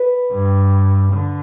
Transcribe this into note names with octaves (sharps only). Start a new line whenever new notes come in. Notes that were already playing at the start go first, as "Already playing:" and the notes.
Already playing: B4
G2
D3